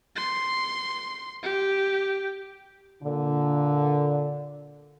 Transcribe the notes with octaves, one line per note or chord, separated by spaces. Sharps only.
C6
G4
A#2 D3